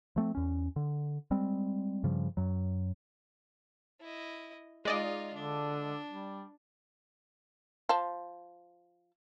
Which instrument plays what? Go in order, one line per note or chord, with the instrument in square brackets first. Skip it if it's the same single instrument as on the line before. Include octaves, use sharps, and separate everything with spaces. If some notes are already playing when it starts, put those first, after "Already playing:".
[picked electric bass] F3 A3 C4
E2 C#4
D3
G3 G#3 C4
G2 C#3 F3 G3
F#2 F#3
[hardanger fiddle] E4 D#5
[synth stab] G#3 D5 D#5 [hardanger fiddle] D#4 F4
[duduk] D3 [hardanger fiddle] D4
[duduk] G3
[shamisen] F3 A5